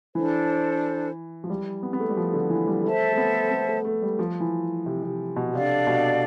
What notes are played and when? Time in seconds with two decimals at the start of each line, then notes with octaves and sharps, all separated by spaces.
0.15 E3 D4 A4 C5
1.44 F3
1.50 G3
1.83 B3
1.93 B3
2.00 A3
2.10 G3
2.17 F3
2.34 D3
2.50 E3
2.67 G3
2.84 A3 A4 C5 E5 A5
3.12 A3
3.17 B3
3.51 B3
3.68 A3
3.85 A3
4.02 G3
4.19 F3
4.40 E3
4.86 C3
5.03 C3
5.36 B2
5.53 C3 D4 A4 D5 F5
5.87 B2